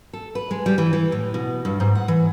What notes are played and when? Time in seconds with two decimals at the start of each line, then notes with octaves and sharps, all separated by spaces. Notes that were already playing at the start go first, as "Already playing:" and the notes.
0.13 A4
0.35 B4
0.51 G#3
0.66 G3
0.78 E3
0.93 E3
1.12 A2
1.34 B2
1.65 G2
1.80 G#2
1.95 F#5
2.08 E3